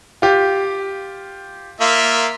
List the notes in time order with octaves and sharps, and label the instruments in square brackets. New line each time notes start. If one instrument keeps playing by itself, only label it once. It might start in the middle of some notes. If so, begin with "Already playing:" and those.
[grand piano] F4 G4
[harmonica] A#3 F4 E5